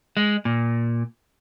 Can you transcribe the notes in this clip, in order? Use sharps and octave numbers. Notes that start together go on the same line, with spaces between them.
G#3
A#2